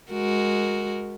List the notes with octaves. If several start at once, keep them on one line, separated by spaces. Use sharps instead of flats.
G#3 F#4 A#4